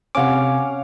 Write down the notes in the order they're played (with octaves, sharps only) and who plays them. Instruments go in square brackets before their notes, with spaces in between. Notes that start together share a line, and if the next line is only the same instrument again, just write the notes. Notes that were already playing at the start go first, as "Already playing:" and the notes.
[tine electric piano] C3 D6 [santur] C#4 F5 F#5